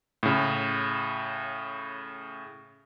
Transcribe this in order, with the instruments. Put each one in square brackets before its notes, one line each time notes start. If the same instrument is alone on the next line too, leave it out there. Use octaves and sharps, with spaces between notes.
[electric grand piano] A2 C#3